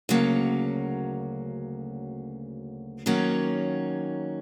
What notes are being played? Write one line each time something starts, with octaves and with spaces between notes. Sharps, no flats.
D2 C#3 F#3 A#3
D#3 F#3 A#3 C#4